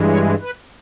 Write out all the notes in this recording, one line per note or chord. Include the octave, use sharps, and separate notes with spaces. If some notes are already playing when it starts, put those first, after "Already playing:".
Already playing: G2 E3 G#3
C#5
B4